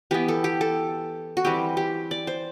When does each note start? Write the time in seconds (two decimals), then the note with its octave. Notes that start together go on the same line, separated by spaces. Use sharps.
0.11 E3 B3 G4
0.28 A4
0.44 G4
0.61 A4
1.37 F#4
1.44 E3 G3 C4 G4
1.77 G4
2.11 D5
2.27 C5